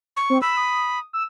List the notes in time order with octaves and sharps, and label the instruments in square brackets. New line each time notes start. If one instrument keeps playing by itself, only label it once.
[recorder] C#6
[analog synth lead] C4
[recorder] B5 [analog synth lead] E6
[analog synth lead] D#6
E6